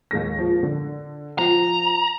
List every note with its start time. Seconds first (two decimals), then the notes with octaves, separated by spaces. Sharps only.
0.11 D#2 G#3 A#6
0.39 F3
0.63 D3
1.38 F3 A#5